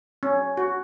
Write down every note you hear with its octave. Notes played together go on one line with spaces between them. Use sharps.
C#4
F#4